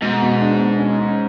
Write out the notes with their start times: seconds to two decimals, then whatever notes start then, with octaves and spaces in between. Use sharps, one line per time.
0.02 G#2 B2
0.22 B2
0.41 D4
0.60 B2
0.79 C#4
0.99 C#4